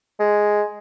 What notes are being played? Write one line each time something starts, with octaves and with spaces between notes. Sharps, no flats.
G#3